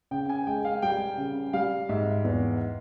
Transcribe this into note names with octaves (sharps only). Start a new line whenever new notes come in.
C#3 G5
G#5
G#3 G5
F5
G3 G5
C#3
G3 F5
G#2 E5
E2